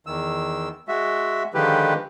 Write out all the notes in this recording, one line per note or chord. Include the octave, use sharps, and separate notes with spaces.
E2 D#3 E6
G#3 F#4 E5
D3 D#3 F3 G#3 G4 B4